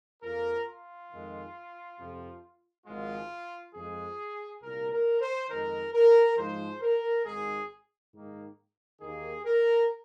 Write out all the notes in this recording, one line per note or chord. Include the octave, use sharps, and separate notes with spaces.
F2 F3 A#3 A#4
F4
F2 D#3 G#3
F2 C3 F3
G#1 G#2 F3 G#3 F4
F2 F3 G#3 G#4
C2 A#2 A#3 A#4
A#4
C5
F2 D#3 G#3 A#4
A#4
G#2 F3 G#3 C5
A#4
G#1 G#2 G#3 G#4
G#2 D#3 A#3
D#2 D#3 A#3 G#4
A#4